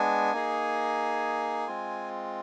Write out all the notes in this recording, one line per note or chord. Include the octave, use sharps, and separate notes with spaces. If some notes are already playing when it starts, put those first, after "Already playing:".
Already playing: G#3 B3 D4 G#5
A#3 D#4 G#4
G#3 C4 F4